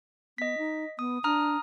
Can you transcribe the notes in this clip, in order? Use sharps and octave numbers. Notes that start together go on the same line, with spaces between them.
B3 D#5 B6
D#4
B3 D#6
D4 A#5 D#6 F6